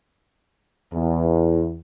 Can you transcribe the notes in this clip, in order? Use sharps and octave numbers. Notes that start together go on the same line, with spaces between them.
E2